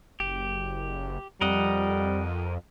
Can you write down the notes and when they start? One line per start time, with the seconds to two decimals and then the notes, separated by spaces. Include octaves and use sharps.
0.20 F#1 G4
1.41 F2 G3 A#4 D#5 F#5